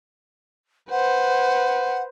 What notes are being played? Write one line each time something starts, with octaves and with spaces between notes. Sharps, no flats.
B4 C5 F#5